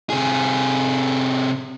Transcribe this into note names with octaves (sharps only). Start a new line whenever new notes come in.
C3 G#4